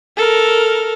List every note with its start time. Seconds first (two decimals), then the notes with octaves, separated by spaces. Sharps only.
0.17 A4 A#4